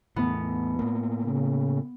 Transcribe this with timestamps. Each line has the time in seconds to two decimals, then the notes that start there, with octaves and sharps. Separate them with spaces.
0.16 E2 A2 B3
0.79 A2 A#3
1.23 C#3